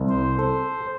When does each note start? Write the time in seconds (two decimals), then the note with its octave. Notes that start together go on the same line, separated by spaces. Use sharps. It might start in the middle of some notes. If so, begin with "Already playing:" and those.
Already playing: C2
0.09 C5
0.39 A4 C5